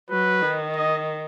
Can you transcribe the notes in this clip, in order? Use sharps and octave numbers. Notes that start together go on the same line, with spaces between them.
F#3 B4
D#3
D#5